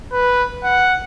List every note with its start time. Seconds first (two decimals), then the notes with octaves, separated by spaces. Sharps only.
0.12 B4
0.64 F#5